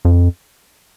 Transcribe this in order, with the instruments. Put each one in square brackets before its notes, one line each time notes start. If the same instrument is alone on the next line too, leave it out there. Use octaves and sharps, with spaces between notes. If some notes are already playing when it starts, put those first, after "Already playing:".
[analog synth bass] F2